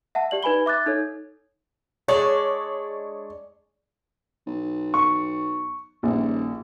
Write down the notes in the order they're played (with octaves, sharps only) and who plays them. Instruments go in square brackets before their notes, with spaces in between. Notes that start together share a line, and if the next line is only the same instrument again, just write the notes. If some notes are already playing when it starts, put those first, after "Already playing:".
[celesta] E5 F#5 A5
G4 D5 F#7
D#4 B4 G#5 B5 G7
E5 D6 F#6 A6
D#4 A4 C#5
[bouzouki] G#3 D4 D5 [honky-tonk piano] C#5
[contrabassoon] B1
[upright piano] C#6
[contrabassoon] D#1 [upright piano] A#1